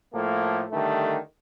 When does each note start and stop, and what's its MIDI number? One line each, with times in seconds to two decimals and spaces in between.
0.14 0.65 45
0.14 0.65 53
0.14 0.65 57
0.14 0.65 58
0.71 1.18 50
0.71 1.18 51
0.71 1.18 55
0.71 1.18 57